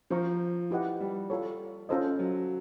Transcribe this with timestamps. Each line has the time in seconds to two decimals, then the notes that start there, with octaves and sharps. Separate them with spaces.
0.10 F3 C5 F5 A#5 C#6
0.71 E4 G4 B4 D#5 F#5
1.00 G3
1.30 F4 A4 C#5
1.89 C#4 F4 A4 C5 D#5
2.19 F#3